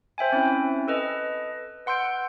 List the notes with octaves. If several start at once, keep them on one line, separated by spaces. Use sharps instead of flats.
C5 E5 G5 G#5
C4 C#4 E4
A4 B4 D#5
B4 F#5 C6 E6 G6 D7